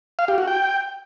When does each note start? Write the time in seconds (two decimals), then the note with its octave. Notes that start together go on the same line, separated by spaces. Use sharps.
0.19 F5
0.28 G4
0.38 F#4
0.48 G5